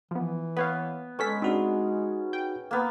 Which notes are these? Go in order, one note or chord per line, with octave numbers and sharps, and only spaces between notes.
E3 F3 B3
B3 B4 C#5 F5
G#3 B3 C#4 A4 B6
C4 D4 D#4 F#4 G#4
G5
A#3 B3